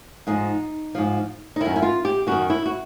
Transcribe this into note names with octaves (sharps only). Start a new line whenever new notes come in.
G#2 F3 D#4
G#2 F3
D#4
F#2 D#3 E4
E4
F4
G4
F#2 D#3 F#4
E4
F#4